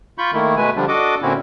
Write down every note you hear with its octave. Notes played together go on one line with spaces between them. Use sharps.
F4 B5 C#6 G6
D#3 A3 A#3 E4
B2 G#3 A3 B4 G#5
D3 F3 G3 D4
D4 F#4 A4 D#5 D6
A#2 D3 C4 C#4 E4 F#4